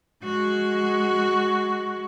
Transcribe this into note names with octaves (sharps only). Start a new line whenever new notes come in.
G#3 F#4